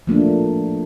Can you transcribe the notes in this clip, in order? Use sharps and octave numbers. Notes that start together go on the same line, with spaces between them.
F3 A3 A#3 D4